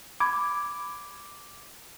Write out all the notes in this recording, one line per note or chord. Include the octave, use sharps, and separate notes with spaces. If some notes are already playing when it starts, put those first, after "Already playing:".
B5 D6 G#6